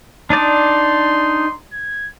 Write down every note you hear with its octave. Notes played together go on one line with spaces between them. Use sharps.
D4 D#4 D5 C6
G#6